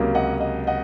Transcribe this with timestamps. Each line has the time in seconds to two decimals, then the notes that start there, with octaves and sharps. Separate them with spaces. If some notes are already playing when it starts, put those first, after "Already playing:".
Already playing: C#2 C3 F#3 A#3 C#4
0.15 D#5 F#5
0.41 D#5 F#5
0.67 D#5 F#5